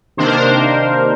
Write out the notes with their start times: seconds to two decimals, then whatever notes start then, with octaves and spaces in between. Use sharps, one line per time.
0.17 C3 D#3 A#3 D4 C5
0.27 A#4
0.37 C5